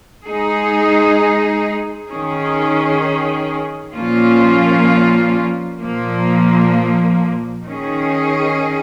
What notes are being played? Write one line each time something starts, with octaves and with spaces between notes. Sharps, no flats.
G#3 D#4 G#4
D#3 C#4 G#4
A#2 F3 A#3 C#4 F4
A#2 F3 A#3
D#3 C#4 G#4